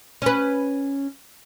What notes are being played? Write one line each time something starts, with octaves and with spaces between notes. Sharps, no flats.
C#4 B4